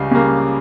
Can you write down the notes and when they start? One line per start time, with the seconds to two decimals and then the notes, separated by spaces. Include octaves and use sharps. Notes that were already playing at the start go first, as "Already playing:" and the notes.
Already playing: C#2 C#3 G3 F5
0.11 C#3 G3 A#3